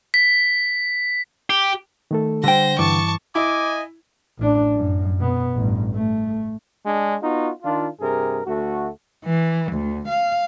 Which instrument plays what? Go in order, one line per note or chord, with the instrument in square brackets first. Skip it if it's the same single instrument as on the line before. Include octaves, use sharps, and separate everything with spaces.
[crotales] B6
[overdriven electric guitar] G4
[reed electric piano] D#3 A3 A4
[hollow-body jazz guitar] D3 G5 [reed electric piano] G3 [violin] C5 A#6
[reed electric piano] G2 E3 D6 [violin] A5 C#6
[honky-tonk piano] E4 [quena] D#5 [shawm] G#5 [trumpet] D6
[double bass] A1 D4
F#2
B2 B3
A1 G2
A3
[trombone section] G#3 D4
B3 D#4 F4 F#4
D#3 D4 F4
G2 C3 G#4 A#4
D2 A3 F#4
[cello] E3
D2
F5